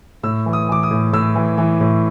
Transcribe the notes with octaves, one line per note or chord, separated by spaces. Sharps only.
A2 E6
E3
D#6
E3 D6
D#6
A2
A2 E6
E3
E3
A2